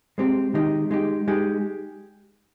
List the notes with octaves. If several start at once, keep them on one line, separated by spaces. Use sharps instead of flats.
G#3 C4 G4
D#3 G#3 D#4 G4
G#3 D#4 G4
G#3 D#4 G4